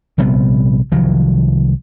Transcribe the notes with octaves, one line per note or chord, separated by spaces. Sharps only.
A#1 C3 G3 B3
C2 D#3 F3 F#3